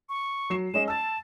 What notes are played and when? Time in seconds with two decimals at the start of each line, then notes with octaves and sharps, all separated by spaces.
0.09 C#6
0.50 F#3 C7 E7
0.74 G#3 C#4 D#5 E7
0.87 A5 E6 A6